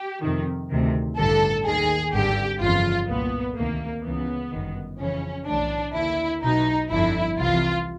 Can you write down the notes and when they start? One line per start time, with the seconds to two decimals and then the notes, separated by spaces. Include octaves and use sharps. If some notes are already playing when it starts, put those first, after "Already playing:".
Already playing: G4
0.23 F2 C3 D#3
0.70 D2 C3 D#3
1.18 A1 G2 D3 A4
1.66 D#2 D#3 G#4
2.13 G#1 G2 D3 G4
2.60 G1 F2 C#3 E3 F4
3.08 C2 A#2 B3
3.56 D2 C3 D#3 A#3
4.03 C#2 C#3 E3 B3
4.52 G1 F#2 D#3
4.99 F2 C#3 E3 C#4
5.47 B1 A2 E3 D4
5.94 D#2 D3 E4
6.42 B1 B2 D#4
6.89 G1 F2 D3 E4
7.37 C2 C3 E3 F4